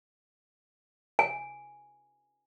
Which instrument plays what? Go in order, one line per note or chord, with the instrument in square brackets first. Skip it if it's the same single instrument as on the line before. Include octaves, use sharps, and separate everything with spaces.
[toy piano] G#5